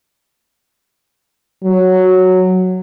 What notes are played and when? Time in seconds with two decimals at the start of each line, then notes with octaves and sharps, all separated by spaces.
1.63 F#3